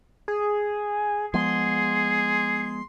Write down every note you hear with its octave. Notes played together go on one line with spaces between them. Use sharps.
G#4
F3 G#3 B3 G#4 C6